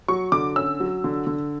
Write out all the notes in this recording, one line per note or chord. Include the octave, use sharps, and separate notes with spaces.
F#3 C#6
D3 D6
C#4 E6
F#3
D3
D3